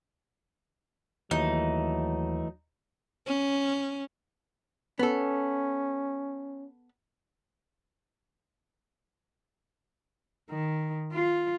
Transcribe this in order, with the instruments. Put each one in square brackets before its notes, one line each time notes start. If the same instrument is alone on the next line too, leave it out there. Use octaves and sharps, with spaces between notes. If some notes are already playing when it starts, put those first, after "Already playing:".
[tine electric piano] D#2 [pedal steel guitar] E3 A3 [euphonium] F#3 [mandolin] D#4
[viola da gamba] C#4
[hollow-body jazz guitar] B3 A4 [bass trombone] C#4
[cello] D#3
F4